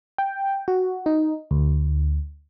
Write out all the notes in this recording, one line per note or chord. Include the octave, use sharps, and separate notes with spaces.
G5
F#4
D#4
D2